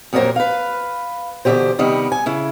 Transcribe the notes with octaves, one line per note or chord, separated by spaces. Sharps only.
F2 A#2 F#3 G4 A#4 C5
B4 F5
B2 D3 E3 F#3 G4 C5
C3 D#3 G3 B3
G#5
C#3 E4